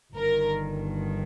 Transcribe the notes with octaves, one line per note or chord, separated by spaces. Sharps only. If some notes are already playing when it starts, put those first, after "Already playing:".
G1 G2 D#3 A#4